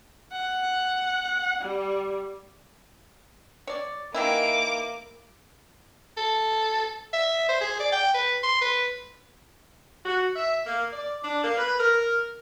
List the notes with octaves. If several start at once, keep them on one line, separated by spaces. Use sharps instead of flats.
F#5
G3
C#5 D5
D#3 E3 A#3 E4 D6
A4
E5
C5
G#4
D5
G5
B4
C6
B4
F#4
E5
A#3
D5
D4
A#3
B4
A#4